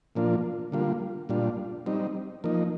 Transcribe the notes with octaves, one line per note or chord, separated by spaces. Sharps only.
A#2 F3 A#3 D4 F4
D3 G3 A#3 F4
A#2 G3 D4 F4
G3 C4 D#4
F3 A#3 D#4